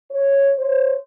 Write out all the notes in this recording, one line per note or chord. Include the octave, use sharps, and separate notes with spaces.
C#5
C5 C#5